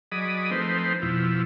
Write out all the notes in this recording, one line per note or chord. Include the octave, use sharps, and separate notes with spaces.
F#3 G#4 D5 D#5 B5 D#6
F3 A3 C4 D#4 B4 C5
F2 B2 F3 E4